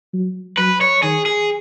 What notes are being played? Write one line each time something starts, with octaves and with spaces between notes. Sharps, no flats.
F#3
F#3 B4
C#5
D#3 G#4
G#4